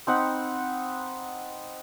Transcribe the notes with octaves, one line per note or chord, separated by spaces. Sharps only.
C4 D#4 F#5 B5